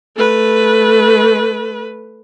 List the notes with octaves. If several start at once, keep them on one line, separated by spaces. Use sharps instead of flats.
A3 B4